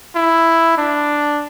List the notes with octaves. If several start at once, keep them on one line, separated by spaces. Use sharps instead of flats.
E4
D4